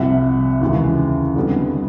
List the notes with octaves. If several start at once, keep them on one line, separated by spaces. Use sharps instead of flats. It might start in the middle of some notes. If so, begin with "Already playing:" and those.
Already playing: C2 C3 F3 E5 F#5
D#2 C#3 E3 G#3
F2 D3 G3 B3